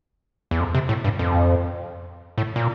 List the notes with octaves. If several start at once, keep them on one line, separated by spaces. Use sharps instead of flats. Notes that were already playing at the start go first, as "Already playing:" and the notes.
E2
F2
C3
A2
G2
F2
A2
A#2